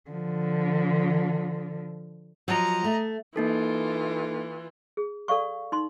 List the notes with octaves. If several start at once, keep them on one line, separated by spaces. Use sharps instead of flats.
D3 F3
F3 F#3 D#5 A#5
A3
E3 A#3 D#4 F4 A4
G#4
A4 D5 F5 C#6
D#4 C6